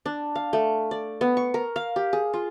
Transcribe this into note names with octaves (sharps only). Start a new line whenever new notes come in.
D4
F5
A3
D5
B3
C#6
A#4
F5
G4
G#4
F4